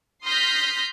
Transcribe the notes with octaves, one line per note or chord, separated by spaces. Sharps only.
C6 D#6 F6 G6 A#6 B6